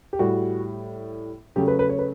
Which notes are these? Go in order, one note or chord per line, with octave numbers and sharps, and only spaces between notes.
G4
A2 G3 F#4
C#3 F#3 A3 G4
B4
B4
C#5
B4